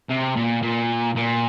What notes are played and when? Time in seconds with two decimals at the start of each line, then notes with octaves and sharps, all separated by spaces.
0.09 C3
0.36 A#2
0.63 A#2
1.16 A#2